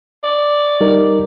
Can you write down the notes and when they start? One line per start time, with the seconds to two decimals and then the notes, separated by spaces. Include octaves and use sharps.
0.23 D5
0.81 G3 D#4 A#4